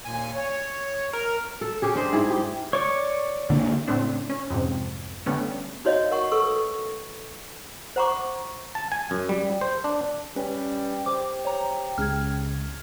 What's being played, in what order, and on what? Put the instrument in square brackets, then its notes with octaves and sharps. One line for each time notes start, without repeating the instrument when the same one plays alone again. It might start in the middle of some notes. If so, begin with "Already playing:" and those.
[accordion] D#2 A#2 G#5
C#5
[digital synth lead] A#4
[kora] A4
C#4 G4 G#4
D4 C5 D#5
G#2 E4 G#4
G4
[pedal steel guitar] C#5 D5 C#6
[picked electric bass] D3 A#3
[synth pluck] A2 C#3 A3 C4 D4
C#4
F2 G#2 C3
D3 G3 A3 B3 C#4
[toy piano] D#4 F#4 C#5 D#5 F5
A#4 F#5 C#6
A4 B4 C#6 E6
C5 F#5 A#5 B5 C#6 D6
[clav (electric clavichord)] A5
G#5
F#2
G3
C5
D4
[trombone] G3 [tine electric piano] C#4 [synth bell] B4
[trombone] G4 [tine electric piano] C5 [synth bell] D6
[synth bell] C#5 A#5
[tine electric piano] C#2 C#3 [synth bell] F6 G#6